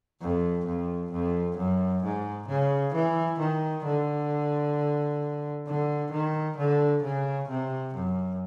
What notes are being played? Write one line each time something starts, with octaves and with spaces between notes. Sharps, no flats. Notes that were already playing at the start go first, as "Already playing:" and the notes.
F2
F2
F2
F#2
G#2
C#3
E3
D#3
D3
D3
D#3
D3
C#3
C3
F#2